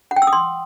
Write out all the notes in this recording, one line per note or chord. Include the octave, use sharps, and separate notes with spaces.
F#5
G5
E6
D#6
C6